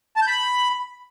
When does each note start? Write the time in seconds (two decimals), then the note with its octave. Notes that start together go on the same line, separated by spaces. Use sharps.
0.17 A5
0.22 G6
0.27 B5